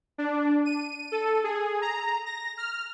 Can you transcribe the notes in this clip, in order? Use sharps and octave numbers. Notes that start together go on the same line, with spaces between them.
D4
D#7
A4
G#4
A#5
A#6
F6